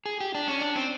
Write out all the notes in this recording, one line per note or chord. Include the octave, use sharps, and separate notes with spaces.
G#4
G4
D4
C#4
D4
C4